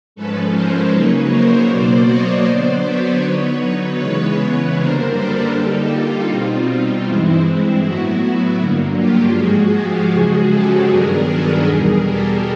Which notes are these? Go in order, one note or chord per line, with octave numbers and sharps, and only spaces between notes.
G#2 F3 G#3 C#4 A4 B4
A#4 C5
C#3 F#3 A#3 D#4 B4 C#5
A#4 C5
B2 F#3 A#3 C5 D5
C#5 D#5
D3 F#3 B3 C5 D5
B4 C#5
D3 F#3 B3 D#4
C#3 E3 G#3 B3 B4 C#5
B4 C#5
F#2 D3 G3 A#3 D4 A#4 C5
A4 B4
D3 G3 A#3 D#4 G4 A4
F4
B2 G3 C4 D#4 F4
F4
G2 E3 G#3 C4 E4
A2 F#3 B3 E4 F#4
G2 D3 F#3 A#3
F4 G4
G#2 F3 G#3 F#4 G#4
F4 G4
F#2 C#3 F3 G#3 F#4 G#4
G4 A4
G2 D#3 F#3 B3 D4 G#4 A#4
A4 B4
E2 B2 G3 G#4 A#4
G4 A4